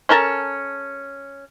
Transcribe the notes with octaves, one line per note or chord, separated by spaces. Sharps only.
C#4 A4 A#4 A5